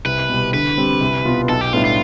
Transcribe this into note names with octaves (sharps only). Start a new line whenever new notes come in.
C2 B4
B2 G3
D3 B4
G3 C4 G4
C2
B2 B3 F4
B1 A4
G4
A2 G3 B3 D4 F4
F4